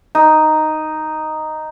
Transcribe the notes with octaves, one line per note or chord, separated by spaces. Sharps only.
D#4